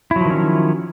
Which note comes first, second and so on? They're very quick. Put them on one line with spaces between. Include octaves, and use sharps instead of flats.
E4 F#3 F3 D#3 C#4